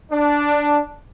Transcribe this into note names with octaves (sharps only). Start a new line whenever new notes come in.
D4